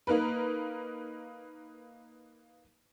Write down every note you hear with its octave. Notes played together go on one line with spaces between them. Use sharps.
A#3 D#4 A#4 B4